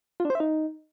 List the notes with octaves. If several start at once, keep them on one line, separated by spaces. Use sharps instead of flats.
F4
D4
C5
E5
D#4